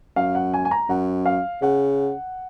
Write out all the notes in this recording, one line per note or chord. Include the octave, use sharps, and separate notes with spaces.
F#2 F5
F#5
G#5
G#5
A#5
F#2 F#5
F5
C#3 F#5